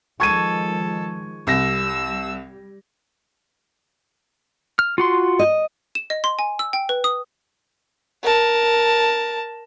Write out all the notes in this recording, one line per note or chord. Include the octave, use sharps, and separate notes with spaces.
D#3 F3 G#3 A4 C#6 G#6 D#7
C2 G3 E6 A#6
F6
F4 F#4 C6
D#5
E7
D#5
C6
G#5
E6
G5
B4
D#6
A#4 A5